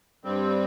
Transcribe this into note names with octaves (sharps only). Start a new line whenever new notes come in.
G2 G3 C4